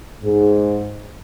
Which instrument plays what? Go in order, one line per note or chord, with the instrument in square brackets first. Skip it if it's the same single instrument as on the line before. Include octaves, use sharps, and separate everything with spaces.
[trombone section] G#2